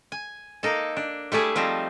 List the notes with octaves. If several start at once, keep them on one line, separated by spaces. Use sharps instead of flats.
G#5
A#3 D#4 A4
D4
G3 A3 E4 G#4
F3 G3 C4 D#4